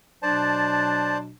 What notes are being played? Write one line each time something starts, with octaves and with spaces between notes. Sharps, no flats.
B2 F#3 D4 C5 D5 A5